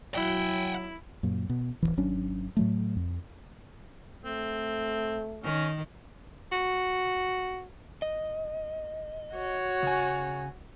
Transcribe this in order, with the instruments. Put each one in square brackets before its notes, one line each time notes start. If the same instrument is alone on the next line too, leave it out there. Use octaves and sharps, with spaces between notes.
[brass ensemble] F#3 [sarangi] E4 [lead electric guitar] F#5 G5
[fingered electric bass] F#2 A#2
B2
D1 C2 E3
G#1 F#3 C#4 D4
A2 F#3 A3
F2
[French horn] A3 [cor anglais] C4
[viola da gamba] D#3 [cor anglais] C#4
[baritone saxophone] F#4
[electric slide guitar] D#5
[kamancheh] F#4 C#5
[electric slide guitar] C#3 G#5